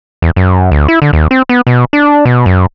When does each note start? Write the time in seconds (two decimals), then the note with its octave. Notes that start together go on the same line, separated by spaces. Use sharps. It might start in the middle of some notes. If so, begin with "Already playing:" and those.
0.22 E2
0.36 F#2
0.71 D2
0.88 E4
1.02 D3
1.13 D#2
1.31 C4
1.49 B3
1.67 B2
1.93 D4
2.25 B2
2.46 F#2